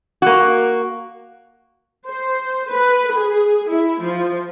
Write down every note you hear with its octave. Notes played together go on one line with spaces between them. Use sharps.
A#3 F#4
C5
B4
G#4
E4
F3